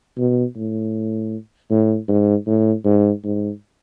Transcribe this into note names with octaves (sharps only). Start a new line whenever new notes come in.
B2
A2
A2
G#2
A2
G#2
G#2